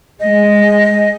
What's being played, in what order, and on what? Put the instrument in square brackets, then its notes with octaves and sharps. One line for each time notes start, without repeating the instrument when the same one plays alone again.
[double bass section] G#3 [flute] D#5